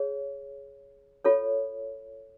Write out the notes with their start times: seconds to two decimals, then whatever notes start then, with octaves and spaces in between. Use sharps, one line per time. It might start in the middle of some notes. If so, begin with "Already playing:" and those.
Already playing: G#4 C#5
1.25 F4 A4 C#5